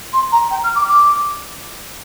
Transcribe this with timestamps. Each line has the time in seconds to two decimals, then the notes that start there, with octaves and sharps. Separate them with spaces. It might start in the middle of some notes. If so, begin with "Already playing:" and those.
0.13 C6
0.32 A#5
0.50 G5
0.63 F6
0.75 D6
0.88 D6